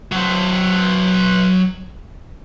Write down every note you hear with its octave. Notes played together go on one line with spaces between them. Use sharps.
F#3 C5